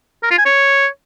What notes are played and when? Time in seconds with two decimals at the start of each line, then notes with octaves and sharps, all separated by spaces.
0.23 A#4
0.31 F4
0.38 G#5
0.46 C#5